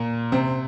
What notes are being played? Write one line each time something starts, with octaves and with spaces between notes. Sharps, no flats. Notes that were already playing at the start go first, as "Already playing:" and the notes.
Already playing: A#2 A#3
C3 C4